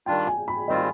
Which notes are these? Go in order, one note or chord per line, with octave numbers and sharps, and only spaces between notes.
D#3 G3 D4 F4 G5
G#5
B5
D#3 G3 C4 F4 D#5